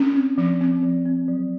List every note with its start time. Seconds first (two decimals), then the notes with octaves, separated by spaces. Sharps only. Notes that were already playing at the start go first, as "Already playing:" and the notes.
Already playing: C#4
0.16 C4
0.38 F3
0.61 C4
0.83 F3
1.06 C4
1.28 F#3